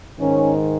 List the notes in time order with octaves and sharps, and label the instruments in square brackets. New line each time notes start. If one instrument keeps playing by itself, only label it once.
[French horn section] G#2 D#3 C#4